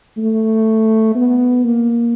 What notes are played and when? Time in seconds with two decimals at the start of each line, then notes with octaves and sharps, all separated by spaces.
0.17 A3
1.15 B3
1.64 A#3